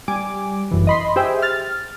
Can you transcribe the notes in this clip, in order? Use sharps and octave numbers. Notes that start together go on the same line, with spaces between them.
G3 G#5 D6
G1 F#2 E3
D#5 B5 C6
G4 G#4 C5 E5 G5
F6 A6